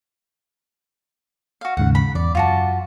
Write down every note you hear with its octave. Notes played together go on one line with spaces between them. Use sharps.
F#4 F5
D#2 G#2 C#3 F#5
B5
E2 D5
F#2 F4 F#4 A5